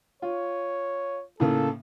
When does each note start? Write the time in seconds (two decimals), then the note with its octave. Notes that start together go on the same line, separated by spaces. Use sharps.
0.22 F4 C#5
1.40 A2 C#3 A#3 A4